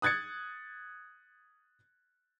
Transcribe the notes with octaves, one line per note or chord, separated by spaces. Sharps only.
D#6 F#6 G#6 A6 C#7